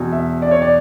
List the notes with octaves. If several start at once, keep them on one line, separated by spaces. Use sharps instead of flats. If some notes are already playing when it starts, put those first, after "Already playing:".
Already playing: E2 B2
E5
D5
C#5
D5